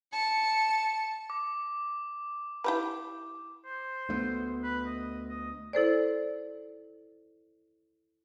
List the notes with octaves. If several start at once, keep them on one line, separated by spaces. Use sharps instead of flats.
A5 C#7
D6
E4 G4 B4
C5
D2 A3 B3
B4
D#5
D#5
E4 A4 C5 D5